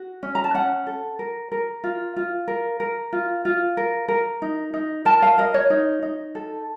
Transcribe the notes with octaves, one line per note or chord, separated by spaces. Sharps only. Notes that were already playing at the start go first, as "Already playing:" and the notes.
Already playing: F#4
C#4
A#5
A5
C#4 F#5
A4
A#4
A#4
F4
F4
A#4
A#4
F4
F4
A#4
A#4
D#4
D#4
A#4 A5
F5
A#4 D#5
C#5
D#4
D#4
A4